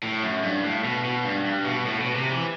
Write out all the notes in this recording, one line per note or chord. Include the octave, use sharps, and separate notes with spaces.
A2
F#2
G2
A2
B2
B2
G2
G2
B2
A2
B2
C3
E3